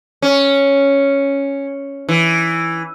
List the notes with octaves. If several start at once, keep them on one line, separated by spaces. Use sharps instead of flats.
C#4
E3